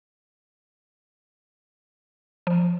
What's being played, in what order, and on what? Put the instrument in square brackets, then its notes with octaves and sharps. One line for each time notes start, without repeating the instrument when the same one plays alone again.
[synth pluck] F3